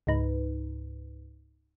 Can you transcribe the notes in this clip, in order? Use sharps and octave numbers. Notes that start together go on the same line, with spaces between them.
C#2 G#2 D#4 B4